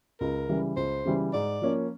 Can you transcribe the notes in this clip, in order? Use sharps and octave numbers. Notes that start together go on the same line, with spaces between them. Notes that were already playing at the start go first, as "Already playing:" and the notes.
C#2 A#4
C#3 E3 G3
C#2 C5
C#3 E3 G3
G#2 D5
F3 A#3 C#4